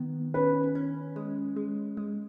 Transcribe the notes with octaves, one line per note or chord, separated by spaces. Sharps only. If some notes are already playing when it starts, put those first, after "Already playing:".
Already playing: D#3 B3
C#4 B4
C#4
G#3
G#3
G#3